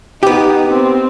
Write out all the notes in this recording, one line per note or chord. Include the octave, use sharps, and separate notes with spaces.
B3 D#4 G4
C4